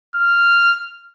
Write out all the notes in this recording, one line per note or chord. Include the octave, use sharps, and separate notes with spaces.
F6